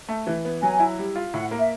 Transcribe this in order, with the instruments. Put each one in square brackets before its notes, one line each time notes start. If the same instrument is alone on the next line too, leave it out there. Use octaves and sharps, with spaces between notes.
[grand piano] A3
E3
B3
[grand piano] F#3 [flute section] G#5
[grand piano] E4
G3
F4
[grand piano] A2 [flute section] F#5
[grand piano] A#3
[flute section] E5